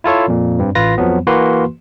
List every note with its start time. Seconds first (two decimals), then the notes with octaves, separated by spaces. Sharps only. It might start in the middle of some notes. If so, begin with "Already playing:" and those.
0.04 E4 F4 A4 C#5
0.28 F2 A#2
0.59 G2 C4
0.75 A1 F4 B4 A#6
0.98 F2 F3 F#3 B3
1.27 E3 A#3 F#4 B4 C6